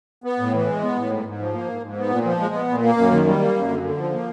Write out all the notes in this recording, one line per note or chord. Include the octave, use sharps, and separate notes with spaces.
B3
A2
E3
G#3
B3
A2
G#2
G#2
F3
A#3
G#2
G#2
B3
A#2
F3
G#3
B3
A#2
A#3
F#2
D#3
G3
A#3
F#2
D3
D3
F3
A#3